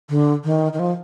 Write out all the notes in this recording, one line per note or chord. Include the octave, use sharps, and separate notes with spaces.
D3
D#3
D#3
F3